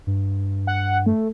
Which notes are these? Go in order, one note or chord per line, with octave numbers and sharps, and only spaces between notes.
G2
F#5
A3